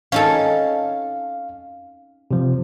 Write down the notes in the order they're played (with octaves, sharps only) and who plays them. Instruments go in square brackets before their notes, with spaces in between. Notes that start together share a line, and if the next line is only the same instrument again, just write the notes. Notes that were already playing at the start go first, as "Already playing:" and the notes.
[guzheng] C#4 D#4 A4 [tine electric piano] F5
[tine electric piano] C3 F3